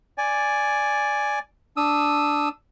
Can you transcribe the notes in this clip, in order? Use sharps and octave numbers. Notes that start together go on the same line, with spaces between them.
D5 G#5
D4 D#6 E6